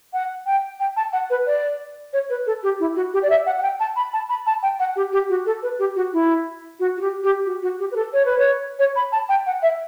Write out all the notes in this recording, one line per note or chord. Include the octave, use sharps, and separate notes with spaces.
F#5
G5
G5
A5
F#5
B4
D5
C#5
B4
A4
G4
E4
F#4
G4
D5
E5
F#5
F#5
G5
A5
B5
A5
B5
A5
G5
F#5
G4
G4
F#4
A4
B4
G4
F#4
E4
F#4
F#4
G4
G4
F#4
F#4
G4
B4
A4
C#5
B4
C#5
C#5
B5
A5
G5
F#5
E5